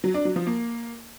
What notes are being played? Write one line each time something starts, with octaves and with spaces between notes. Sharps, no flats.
F#3
D4
F#3
F3
A#3